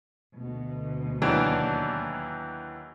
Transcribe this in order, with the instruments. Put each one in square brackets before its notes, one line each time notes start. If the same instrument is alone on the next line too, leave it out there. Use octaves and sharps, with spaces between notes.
[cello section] D2 B2
[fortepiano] D#2 E3 F#3 [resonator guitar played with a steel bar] D4